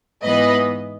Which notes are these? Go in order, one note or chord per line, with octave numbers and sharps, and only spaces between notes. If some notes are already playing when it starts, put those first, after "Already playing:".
G#2 E3 B3 B4 D#5